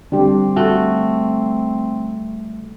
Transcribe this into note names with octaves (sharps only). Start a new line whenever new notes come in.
D3 G3 C4 D4 G4
A3 F#4